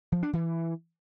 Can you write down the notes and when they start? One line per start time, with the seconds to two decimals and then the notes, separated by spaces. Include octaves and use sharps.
0.12 F3
0.23 D4
0.33 E3